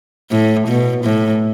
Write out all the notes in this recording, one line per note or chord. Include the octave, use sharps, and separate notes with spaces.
A2
B2
A2